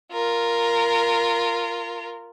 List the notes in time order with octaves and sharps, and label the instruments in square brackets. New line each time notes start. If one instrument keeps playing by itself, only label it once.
[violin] F4 A#4